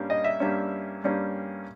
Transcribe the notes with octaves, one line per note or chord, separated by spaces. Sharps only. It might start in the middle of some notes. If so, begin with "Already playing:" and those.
Already playing: G2 G3 A#3 C#4
D#5
E5
G2 G3 A#3 C#4
G2 G3 A#3 C#4